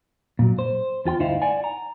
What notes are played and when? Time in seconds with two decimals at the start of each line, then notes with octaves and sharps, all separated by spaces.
0.39 A#2 F#3
0.59 C5
1.05 E2 F4 G5 C6
1.19 D2 G2 D#4 E4 C5 F5
1.42 D5 F#5 G#5
1.64 A#5